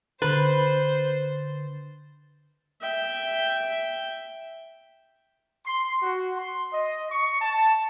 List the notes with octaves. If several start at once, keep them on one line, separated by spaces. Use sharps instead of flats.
D3 B4 C5 A6
E5 G5
C6
F#4
C6
D#5
C#6
A5